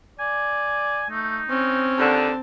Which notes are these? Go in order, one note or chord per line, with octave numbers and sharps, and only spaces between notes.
D5 G#5
A3 D#4
C4 C#4
D#2 D3 A5